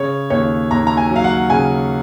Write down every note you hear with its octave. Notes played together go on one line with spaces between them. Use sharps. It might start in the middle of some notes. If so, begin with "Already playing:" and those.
Already playing: C#3 C#5
D#2 C#5
D#2 A#5
A#5
G#5
F#3
F5
F#5
C#3 G#5